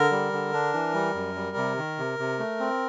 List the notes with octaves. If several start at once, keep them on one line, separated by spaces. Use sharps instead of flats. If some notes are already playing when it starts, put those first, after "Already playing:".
Already playing: D3 A#4
G3
D3
D4
E3
G3
F#2
G3
C3
D#3
C3
C3
A3
C4